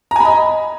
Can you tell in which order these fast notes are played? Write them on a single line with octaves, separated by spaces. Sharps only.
A#5 G#5 B5 D#5